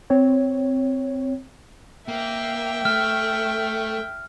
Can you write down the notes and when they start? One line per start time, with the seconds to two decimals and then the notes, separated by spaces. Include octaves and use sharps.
0.10 C4 C#5
2.08 A#3 E5 G5
2.85 A3 F6